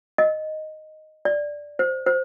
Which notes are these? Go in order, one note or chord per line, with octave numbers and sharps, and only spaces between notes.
D#5
D5
C5
C5